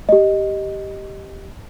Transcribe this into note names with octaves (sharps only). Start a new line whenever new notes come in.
G4 D#5